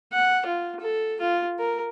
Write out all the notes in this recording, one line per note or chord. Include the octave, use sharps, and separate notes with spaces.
F#5
F4
A4
F4
A#4